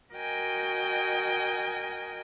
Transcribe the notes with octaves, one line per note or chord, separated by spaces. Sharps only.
F#4 A#4 D#5 G5 G#5